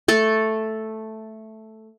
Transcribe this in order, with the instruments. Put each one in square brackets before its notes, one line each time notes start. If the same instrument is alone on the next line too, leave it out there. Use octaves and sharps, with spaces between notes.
[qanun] A3 A4